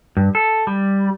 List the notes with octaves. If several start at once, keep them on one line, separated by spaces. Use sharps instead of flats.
G2
A4
G3